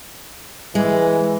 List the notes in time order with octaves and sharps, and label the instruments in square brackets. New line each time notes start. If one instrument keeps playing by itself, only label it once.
[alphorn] E3 [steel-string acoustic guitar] G#3